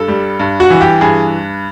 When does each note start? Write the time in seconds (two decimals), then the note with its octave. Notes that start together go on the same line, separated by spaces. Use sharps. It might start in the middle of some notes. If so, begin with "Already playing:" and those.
Already playing: G2 A4
0.08 G3
0.40 G2
0.60 F#4
0.70 E3
0.81 G4
1.01 G2 G#4